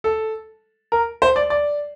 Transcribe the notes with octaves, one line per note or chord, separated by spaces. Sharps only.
A4
A#4
C5
D5
D5